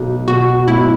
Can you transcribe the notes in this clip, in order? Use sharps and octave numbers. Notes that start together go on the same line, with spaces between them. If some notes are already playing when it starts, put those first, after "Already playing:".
Already playing: B1
B2 F#4
B1 E4